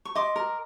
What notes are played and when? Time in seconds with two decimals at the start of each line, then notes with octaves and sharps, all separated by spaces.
0.05 C#6
0.16 D#5 C6 D6
0.36 A#4